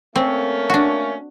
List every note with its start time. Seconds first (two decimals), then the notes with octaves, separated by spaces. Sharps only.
0.16 A3 A#3 C4 C#4
0.70 D4 F#4